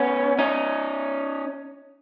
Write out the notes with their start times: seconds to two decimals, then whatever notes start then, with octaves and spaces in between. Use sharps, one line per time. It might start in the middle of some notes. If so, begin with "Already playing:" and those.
Already playing: B3 C#4
0.39 C#4 D#4